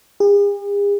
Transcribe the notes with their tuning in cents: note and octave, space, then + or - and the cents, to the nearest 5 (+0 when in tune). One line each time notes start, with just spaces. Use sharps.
G#4 -45